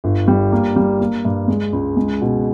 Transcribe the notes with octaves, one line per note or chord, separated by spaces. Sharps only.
G1
G3
A#3
G3
A#3
G2
G#3
C#2
G#3
B2